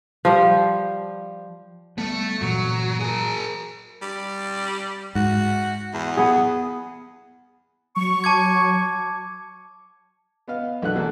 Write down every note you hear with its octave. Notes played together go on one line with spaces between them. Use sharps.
F3 G3
G3 A3 B3
G2 A#2 E3 F#3
G#4 A#4
G3
G#2 F#4
E2
B3 G#4
F#3 C#6
A5 D6 G#6
B3 D#5 F5
B1 E3 A3 D4 F#5 F#6
E2 A#3 G#4 A4